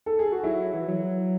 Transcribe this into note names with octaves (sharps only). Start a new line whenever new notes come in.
A4
G#4
F#4
F#3 E4
E3
F#3